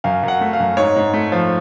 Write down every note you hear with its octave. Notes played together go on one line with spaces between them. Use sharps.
F#2 F5
F#2
F#5
A3
F5
F#2
G#2 C#5
G#2
A3
F3